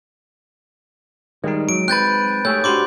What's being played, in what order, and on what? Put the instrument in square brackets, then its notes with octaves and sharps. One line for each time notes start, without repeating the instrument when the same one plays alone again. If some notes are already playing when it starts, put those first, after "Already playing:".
[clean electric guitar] D#3 G3 [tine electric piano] G#3 D#4
[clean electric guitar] F#3 [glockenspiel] D7
[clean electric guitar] C4 B4 [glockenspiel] F#6 G6 A6
[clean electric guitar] A3 G4 G#4 [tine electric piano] C#5 [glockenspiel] G6
[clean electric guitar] D4 [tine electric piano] F#4 G4 C5 [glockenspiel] B5 C6 D6